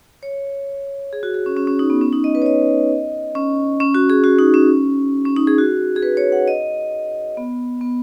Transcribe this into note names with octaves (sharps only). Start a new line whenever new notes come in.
C#5
G#4
F#4
G#4
C#4
C#4
C#4
D#4
B3
C#4
D#4
D#5
B4
C#5
D#5
C#4
C#4
F#4
G#4
F#4
D#4
C#4
C#4
D#4
G#4
F#4
G#4
B4
C#5
F#5
D#5
B3
B3